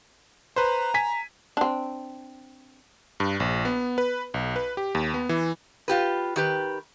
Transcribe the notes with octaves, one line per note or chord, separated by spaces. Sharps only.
B4 C5 A#5
G#5 B6
C4 D4
G2
A#1
B3
B4
B1
B4
G4
D#2
B3
E3
F4 G4 B4
D#3 G4 B4